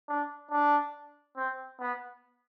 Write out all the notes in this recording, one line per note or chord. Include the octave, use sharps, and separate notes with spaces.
D4
D4
C4
B3